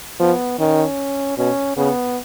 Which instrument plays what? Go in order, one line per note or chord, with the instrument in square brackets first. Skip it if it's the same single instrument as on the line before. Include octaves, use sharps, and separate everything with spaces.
[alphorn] F3 [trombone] B3
[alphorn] D#3 [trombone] C#4
[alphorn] B2 [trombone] C#4
[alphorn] C#3 [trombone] B3